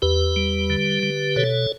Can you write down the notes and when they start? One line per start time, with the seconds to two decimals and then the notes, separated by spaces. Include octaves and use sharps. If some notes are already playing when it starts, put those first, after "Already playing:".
0.02 E2 G4 B4
0.36 G3
0.70 D3
1.03 D3
1.36 B2 A4 C#5